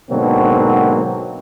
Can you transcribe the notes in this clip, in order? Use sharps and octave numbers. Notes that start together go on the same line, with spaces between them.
G#2 B2 D3 F#3 A#3 C4